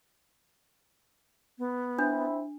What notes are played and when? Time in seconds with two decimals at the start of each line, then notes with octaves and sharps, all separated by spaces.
1.58 B3
1.99 C4 D4 E4